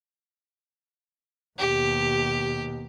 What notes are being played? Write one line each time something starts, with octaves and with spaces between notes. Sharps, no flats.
D#2 B2 G4